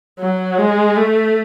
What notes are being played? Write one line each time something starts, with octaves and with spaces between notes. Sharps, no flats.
F#3
G#3
A3